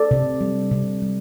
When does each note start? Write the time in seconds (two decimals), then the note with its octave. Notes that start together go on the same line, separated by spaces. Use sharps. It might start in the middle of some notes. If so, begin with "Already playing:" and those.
Already playing: A4 D5
0.11 C3
0.41 G3
0.71 C3
1.02 G3